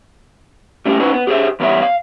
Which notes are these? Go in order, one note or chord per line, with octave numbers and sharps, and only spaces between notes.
G3 A3 C#4 F4 G4
C#4 D#4 F#4 B4 C5
B3
G4 G#4 B4 C5 E5
E3 G3 B3 C#5 E5
F5